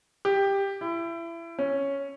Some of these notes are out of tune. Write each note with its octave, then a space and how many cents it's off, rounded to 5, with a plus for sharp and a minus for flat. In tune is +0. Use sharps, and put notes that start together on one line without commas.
G4 +10
E4 +25
C#4 +0